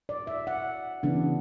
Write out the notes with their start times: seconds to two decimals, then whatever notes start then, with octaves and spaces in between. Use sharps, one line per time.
0.09 D5
0.27 E5
0.47 F#5
1.03 C#3 E3 B3 D4